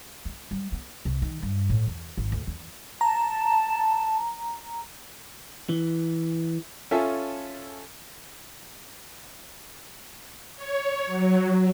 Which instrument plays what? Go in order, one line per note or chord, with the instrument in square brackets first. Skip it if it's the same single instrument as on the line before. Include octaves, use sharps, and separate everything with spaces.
[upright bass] A3
G3
B3
C2
D#3
G2
A2
E2
G#1
D2
E2
[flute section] A5 [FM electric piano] A#5
[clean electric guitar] E3
[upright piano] C#4 F4 A4 E5 G#5
[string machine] C#5
F#3